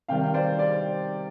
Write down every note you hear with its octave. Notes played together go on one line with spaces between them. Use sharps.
C3 D#3 G3 F5 G5
C5 D5
C5 D5